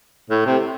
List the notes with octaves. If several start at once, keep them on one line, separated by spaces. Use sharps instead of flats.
A2
C3